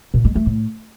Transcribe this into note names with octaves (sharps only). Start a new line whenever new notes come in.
A#2
G#3
A3
A2